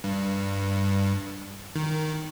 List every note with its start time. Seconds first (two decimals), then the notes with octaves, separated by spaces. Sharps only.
0.04 G2
1.76 D#3